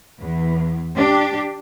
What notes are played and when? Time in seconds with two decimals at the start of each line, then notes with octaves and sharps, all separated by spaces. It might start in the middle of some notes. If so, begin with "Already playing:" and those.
0.19 E2
0.96 D4 G4